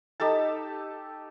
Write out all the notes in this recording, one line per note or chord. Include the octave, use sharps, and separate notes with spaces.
D#4 G4 A4 A5